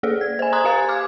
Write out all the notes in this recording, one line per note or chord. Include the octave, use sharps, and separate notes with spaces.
A#3 G#4 A4 D5
G#6
C5 G#5
G#5 A#5 C6 D#6 F#6 G#6
G4 F5 G#5 A6
D6 F6 G#6